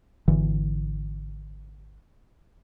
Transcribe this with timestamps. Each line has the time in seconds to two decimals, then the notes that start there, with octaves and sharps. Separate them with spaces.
0.28 G#1 D3 E3